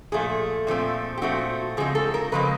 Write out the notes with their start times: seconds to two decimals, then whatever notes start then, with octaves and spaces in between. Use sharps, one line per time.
0.12 A#2 F3 A3 G#4
0.67 A#2 F3 A3 C4
1.18 G4
1.22 A#2 F3 A3 C4 F#4
1.77 C#3 F3 G#3 C4 G#4
1.95 A4
2.14 A#4
2.32 C#3 F3 G#3 C4 B4